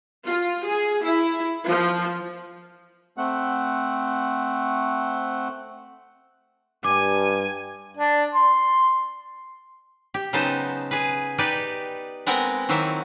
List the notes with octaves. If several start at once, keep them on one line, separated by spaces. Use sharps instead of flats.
F4
G#4
E4
F3
A3 C4 F#5
G2 G#5 D6
D4
C6
G4
C#3 F#3 B3 D#4 C5 A5
G#4 B4
D#4 G4 B4 D5
G#3 B3 C4 A#4 F#5 G5
D#3 F#3 A#3 C4 E4